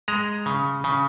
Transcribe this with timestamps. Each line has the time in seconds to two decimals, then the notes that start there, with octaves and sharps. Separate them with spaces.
0.08 G#3 A#5
0.46 C#3
0.84 C#3